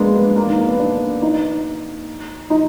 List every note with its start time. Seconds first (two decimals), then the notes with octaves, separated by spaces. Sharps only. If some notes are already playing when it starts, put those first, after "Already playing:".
Already playing: G#3 A#3 B3 D4
0.15 B3
0.36 A#3
0.47 D#3
0.58 A#3
0.69 B3
0.79 D4
1.22 D#4
2.50 D#4